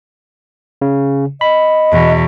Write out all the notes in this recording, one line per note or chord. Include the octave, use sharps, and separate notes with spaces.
C#3
D#5 B5
E2 B2